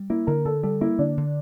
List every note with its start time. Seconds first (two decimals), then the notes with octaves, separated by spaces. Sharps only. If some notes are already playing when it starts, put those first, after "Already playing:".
Already playing: G3
0.10 A#3 E4
0.27 D3 A#4
0.45 D3 A4
0.63 G3 A4
0.81 A#3 E4
0.98 D3 D4
1.17 D3